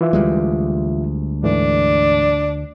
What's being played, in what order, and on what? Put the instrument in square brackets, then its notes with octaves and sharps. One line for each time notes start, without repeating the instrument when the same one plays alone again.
[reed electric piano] E3 F4 E5
[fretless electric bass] D2 G3 G#3
[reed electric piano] G#2 E3 A3 [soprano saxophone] D4